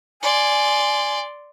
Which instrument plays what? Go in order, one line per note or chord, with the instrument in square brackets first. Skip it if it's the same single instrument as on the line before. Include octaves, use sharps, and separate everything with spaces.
[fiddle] D5 C6 [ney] G#5